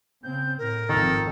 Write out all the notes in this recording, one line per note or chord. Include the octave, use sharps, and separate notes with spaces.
C#3 C4 G6
A2 A#4
G#1 F2 D#3 A4